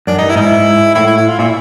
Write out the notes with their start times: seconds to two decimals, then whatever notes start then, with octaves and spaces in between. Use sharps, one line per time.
0.07 F#2 D4
0.18 G2 D#4
0.29 E4
0.36 G#2 D#4
0.40 E4
0.95 A2 E4
1.07 E4
1.18 E4
1.28 F4
1.39 A#2 E4